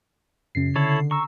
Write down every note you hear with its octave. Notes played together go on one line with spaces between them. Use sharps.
F#2 C#3 C7
D3 E4 A4 C#5
A#5 C#6 E6